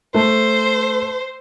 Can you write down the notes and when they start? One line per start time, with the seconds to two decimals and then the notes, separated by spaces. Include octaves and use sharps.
0.14 A3 C5